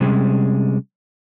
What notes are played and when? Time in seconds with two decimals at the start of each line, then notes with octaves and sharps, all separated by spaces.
0.01 C3 G3 G#3 C#4